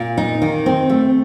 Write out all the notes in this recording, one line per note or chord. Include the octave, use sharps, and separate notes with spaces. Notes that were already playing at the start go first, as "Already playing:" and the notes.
Already playing: A#2
D#4
D#3
C4
A3